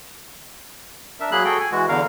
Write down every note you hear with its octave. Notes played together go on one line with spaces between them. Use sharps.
D4 A#4 E5
F#3 A#3 G#4 B5 F#6
F#4 G#4 A4 G5
G#5
E3 G#3 F#4
E2 D3 A#4 F5